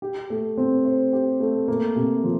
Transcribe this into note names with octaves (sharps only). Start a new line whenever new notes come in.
G4
A3
C4
C5
G4
A3
A#3
C3
F3